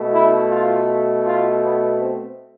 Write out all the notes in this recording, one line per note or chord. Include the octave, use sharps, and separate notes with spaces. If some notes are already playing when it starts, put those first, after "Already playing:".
Already playing: B2 A3
E4
F4
F4
B3
C4